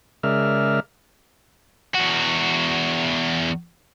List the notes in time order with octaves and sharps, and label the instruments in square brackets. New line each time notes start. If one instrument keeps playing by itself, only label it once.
[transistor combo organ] C#3 G#3 A#4 D5 E5 F6
[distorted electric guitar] E2 F#4